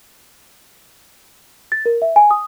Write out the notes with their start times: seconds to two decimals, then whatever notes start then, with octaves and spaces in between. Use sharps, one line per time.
1.72 A6
1.86 A#4
2.02 E5
2.16 G#5
2.31 D#6